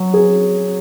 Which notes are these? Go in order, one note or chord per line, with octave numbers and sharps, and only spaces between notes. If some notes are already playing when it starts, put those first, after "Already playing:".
Already playing: F#3
G#4